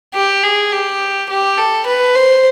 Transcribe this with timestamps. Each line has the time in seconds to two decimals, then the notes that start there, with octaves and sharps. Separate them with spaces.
0.15 G4
0.44 G#4
0.72 G4
1.30 G4
1.58 A4
1.87 B4
2.16 C5